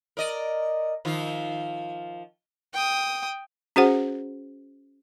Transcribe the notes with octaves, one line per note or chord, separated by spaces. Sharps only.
A#4 D5 D#5
D#3 F3 F4
G5 D#6
C#4 F#4 G#4 C5 F#5